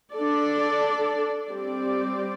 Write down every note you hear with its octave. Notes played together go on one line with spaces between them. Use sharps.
D4 A4 D5
G3 C4 G4 D5